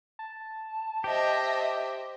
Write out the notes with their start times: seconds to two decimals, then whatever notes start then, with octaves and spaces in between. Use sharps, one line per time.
0.19 A5
1.04 G4 C5 D#5 E5